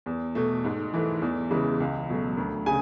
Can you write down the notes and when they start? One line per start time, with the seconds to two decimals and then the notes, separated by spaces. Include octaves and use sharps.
0.06 E2
0.35 B2 A3
0.65 G#2
0.94 E3 A3
1.22 E2
1.51 C#3 E3 G#3
1.80 C#2
2.09 B2 F#3 A3
2.37 D2
2.66 C#3 G#5